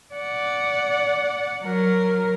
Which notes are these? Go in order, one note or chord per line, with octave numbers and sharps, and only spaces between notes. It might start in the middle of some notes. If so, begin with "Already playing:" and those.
D5 F#5
F#3 A#4